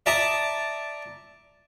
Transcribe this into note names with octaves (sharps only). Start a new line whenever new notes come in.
D5 E5 A5 A#5 D#6